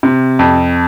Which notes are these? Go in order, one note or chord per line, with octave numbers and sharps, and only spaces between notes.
C3
F2